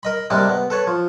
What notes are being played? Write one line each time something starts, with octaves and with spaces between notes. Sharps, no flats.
A#4 D#5 B5
C3 G3 G#3 A#3 D4
B3
A4 B4 C#5
F3